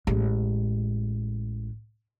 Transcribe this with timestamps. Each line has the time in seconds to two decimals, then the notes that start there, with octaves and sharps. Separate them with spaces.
0.07 A1 G#3